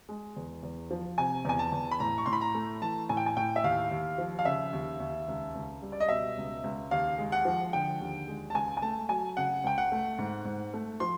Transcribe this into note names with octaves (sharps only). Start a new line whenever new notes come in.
G#3
E2
E2
F3
C3 G#5
E2 G#5
A5
E2
B5
A2 A#5
C#6
A2 C6
B5
A#5
A3
E3 A5
A2 G#5
G5
G#5
A2 G5
E5
D#2 F5
D#2
F3
F5
C#3 E5
D#2
D#2
C#2
C#2
G3
D5
D#5
B2 E5
C#2
C#2
D#2 F5
G#3
F#5
F3
D3 G5
D#2
G#3
A5
C#2 G#5
G#5
A3 A5
F#3 G#5
C#3 F#5
C#2 G5
F#5
A3
G#2
G#2
A3
F3 C6